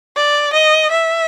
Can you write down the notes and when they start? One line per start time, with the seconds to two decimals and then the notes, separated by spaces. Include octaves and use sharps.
0.16 D5
0.53 D#5
0.91 E5